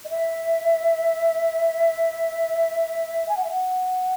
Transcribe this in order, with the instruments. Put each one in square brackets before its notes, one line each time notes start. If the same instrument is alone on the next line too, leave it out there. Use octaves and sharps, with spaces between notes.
[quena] D#5
E5
G#5
F#5
E5
F#5